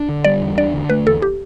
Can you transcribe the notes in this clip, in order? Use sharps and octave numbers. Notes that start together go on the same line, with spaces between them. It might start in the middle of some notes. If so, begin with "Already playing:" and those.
Already playing: D4
D3
G3 D5
E2
D4 D5
D3
A3 B4
E2 A4
G4